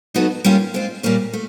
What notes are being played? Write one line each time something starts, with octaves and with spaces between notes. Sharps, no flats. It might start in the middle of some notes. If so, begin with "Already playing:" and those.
F#3 B3 D#4 F#4 A4
G3 A#3 C#4 F4
G#3 C4 F4
A#2 G3 A#3 C#4
A3